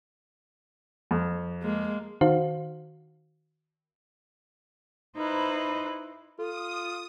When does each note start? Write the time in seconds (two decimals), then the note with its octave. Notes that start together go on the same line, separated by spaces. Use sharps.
1.11 F2
1.62 G#3 A#3
2.21 D#3 D#4 F#4 C5 F5
5.17 D#4 E4 B4 C5
6.39 F4 A4 D#6